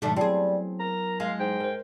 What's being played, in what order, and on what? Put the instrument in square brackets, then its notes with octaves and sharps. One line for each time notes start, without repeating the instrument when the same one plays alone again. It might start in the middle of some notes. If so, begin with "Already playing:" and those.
[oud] G#2 A3 D4 [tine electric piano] B2 D#3 F#3
[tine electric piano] F#3 B3 E4 [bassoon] G3 [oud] C4 G#4
[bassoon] A#4 [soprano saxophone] A#5
[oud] G#3 [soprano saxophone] F5
[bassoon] G#2 [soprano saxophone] G5
[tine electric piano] A#4 C5